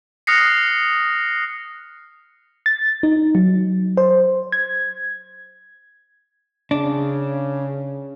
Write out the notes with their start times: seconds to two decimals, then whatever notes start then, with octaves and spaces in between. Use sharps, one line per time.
0.27 D#6 F6 F#6 A#6 C7 C#7
2.66 A6
3.03 D#4
3.35 F#3
3.97 C5
4.52 G#6
6.71 C#3 D4